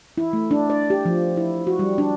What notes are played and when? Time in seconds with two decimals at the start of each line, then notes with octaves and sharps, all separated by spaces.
0.18 E4
0.33 A3
0.51 D4
0.70 D5
0.90 G4
1.05 F3
1.37 E4
1.67 F#4
1.79 G3
1.98 D4